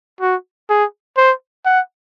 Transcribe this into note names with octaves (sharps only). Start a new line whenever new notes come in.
F#4
G#4
C5
F#5